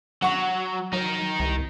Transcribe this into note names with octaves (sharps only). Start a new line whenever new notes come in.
F#3 F#5 C#6
F#3 D#4 A#4
C2